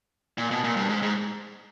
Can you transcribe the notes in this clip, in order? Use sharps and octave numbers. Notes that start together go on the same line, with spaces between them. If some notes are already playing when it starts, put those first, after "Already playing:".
A#2
B2
A#2
G2
G#2
G#2